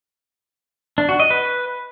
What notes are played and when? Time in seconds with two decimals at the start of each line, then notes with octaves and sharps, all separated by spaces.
0.98 D4
1.09 F#4
1.20 D#5
1.31 B4